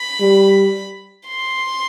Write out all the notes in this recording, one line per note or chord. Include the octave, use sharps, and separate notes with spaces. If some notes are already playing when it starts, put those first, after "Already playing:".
Already playing: B5
G3
C6